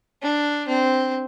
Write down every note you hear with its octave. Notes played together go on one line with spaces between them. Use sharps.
D4
C4